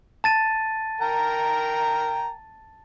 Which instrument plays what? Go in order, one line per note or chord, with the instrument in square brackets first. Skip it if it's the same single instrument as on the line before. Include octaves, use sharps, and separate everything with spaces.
[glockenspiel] A5 A6 D#7
[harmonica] A#4 G5 A#5